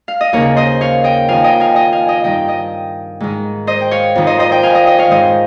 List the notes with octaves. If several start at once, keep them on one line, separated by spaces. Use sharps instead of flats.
F5
D#5
D#2 C#3 A#4 C#5
C5 D#5
C#5 F5
D#5 G5
F2 D#3 F5 G#5
D#5 G5
F5 G#5
D#5 G5
F5 G#5
D#5 G5
G2 D#3 D#5 G5
D#5 G5
G#2 D#3
C5 D#5
G5
C#5 F5
F2 D#3
C5 D#5
C5 D#5
D#5 G5
F5 G#5
D#5 G5
D#5 G5
C#5 F5
G#2 D#3 C5 D#5